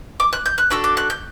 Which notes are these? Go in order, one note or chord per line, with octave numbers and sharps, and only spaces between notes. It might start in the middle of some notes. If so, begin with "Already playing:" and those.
D6
F#6
G6
F#6
D4 F#4 A4 E6
D6
F#6
G6